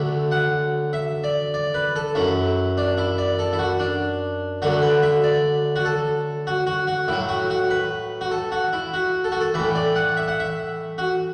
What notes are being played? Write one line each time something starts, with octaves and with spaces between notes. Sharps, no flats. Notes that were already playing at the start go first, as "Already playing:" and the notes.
Already playing: D2 D3 F#3 E5
F#5
E5
D5
D5
B4
A4
F#2 F#3 E4
D4
E4
D5
A4
E4
F#4
D4
D2 D3 F#3 F#4
B4
E5
D5
F#4
A4
F#4
F#4
F#4
A2 F#3 E4
F#4
F#4
B4
F#4
A4
F#4
E4
F#4
A4
F#4
A4
A2 E3 B4
D5
F#5
E5
F#5
E5
F#4